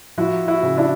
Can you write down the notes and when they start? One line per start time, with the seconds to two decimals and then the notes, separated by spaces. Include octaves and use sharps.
0.18 F3 E4 F#4
0.48 E4 F#4
0.63 C#3
0.77 D4 E4